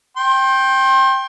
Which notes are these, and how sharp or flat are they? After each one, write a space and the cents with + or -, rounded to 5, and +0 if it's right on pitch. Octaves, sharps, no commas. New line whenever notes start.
G5 +0 C6 +35